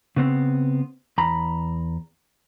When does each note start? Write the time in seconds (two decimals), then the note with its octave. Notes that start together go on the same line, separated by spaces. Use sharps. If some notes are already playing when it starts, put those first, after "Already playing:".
0.17 C#3 B3 C4
1.18 E2 A#5 B5